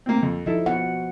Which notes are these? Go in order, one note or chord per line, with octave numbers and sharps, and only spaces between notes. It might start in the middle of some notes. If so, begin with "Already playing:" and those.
A#3 C4
F2
F3 D#4 E4 A4
B2 F#5